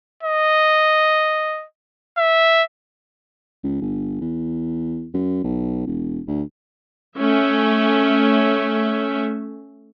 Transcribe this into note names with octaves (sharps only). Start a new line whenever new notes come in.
D#5
E5
C#2
G1
E2
F#2
B1
E1
D2
A3 C#4 E5